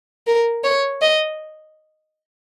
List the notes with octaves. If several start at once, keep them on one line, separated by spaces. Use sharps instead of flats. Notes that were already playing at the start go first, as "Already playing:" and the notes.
A#4
C#5
D#5